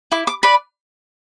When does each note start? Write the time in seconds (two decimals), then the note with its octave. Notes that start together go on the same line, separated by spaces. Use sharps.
0.12 E4 D6
0.27 D6
0.43 B4 D5 B5